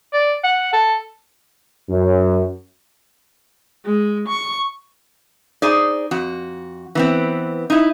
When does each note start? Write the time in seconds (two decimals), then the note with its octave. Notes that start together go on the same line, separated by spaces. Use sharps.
0.13 D5
0.44 F#5
0.73 A4
1.90 F#2
3.85 G#3
4.28 C#6
5.62 D#4 G#4 C5 D5
6.11 F2 F#4
6.95 E3 B3 C4
7.70 D#4 E4